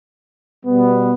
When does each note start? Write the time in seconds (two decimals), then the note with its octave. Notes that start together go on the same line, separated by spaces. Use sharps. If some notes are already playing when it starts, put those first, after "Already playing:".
0.65 B2 G3 B3